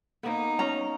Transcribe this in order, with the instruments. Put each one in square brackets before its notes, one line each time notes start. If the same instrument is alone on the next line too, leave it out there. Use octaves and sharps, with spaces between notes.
[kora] A#3 B3 [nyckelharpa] D#4
[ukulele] C#4 A#5